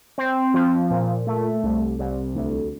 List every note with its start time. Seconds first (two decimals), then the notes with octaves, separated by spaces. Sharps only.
0.18 C4
0.54 F3
0.91 A#2
1.27 A3
1.63 C2
1.99 C2
2.35 D2